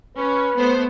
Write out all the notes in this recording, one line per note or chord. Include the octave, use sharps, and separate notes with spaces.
C#4 B4
A3 B3 C5